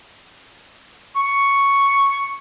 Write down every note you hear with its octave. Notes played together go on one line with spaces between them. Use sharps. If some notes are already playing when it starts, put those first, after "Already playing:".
C#6